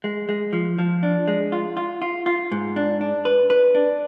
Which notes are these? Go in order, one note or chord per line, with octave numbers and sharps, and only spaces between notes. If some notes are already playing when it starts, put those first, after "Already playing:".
G#3
G#3
F3
F3
D4
G#3
F4
F4
F4
F4
G#2
D4
D4
B4
B4
D4